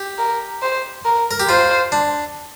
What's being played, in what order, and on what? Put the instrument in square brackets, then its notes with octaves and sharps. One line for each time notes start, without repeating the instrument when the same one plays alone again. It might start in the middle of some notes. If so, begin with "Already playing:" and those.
Already playing: [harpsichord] G4
[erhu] A#4
C5
A#4
[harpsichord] A#4
G4
[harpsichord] F4 [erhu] C5
[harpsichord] D4